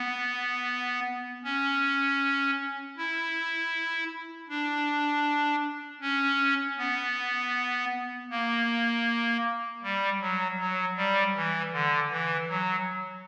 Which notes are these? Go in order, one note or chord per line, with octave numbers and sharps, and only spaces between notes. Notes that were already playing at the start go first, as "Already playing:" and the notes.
Already playing: B3
C#4
E4
D4
C#4
B3
A#3
G3
F#3
F#3
G3
E3
D3
E3
F#3